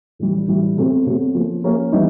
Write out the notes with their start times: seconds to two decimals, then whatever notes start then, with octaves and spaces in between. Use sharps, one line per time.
0.19 A2 E3 G3
0.48 A2 E3 G3
0.77 B2 F#3 A3 C4
1.06 B2 F#3 A3 C4
1.35 F3 A#3 C#4
1.64 F3 A#3 C#4
1.92 E3 G3 B3 D#4